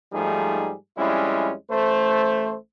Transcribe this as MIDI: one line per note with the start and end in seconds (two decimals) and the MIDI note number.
0.12 0.73 44
0.12 0.73 53
0.12 0.73 55
0.12 0.73 57
0.12 0.73 63
0.12 0.73 68
0.97 1.52 41
0.97 1.52 55
0.97 1.52 56
0.97 1.52 61
0.97 1.52 64
1.70 2.55 33
1.70 2.55 57
1.70 2.55 72